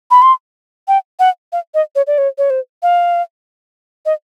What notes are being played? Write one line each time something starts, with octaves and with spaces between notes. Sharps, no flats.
B5
C6
G5
F#5
F5
D#5
C#5
D5
C#5
C#5
C5
F5
D#5